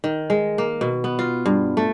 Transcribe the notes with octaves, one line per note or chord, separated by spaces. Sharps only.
D#3
G#3
A#3
B2
B3
F4
G2
A3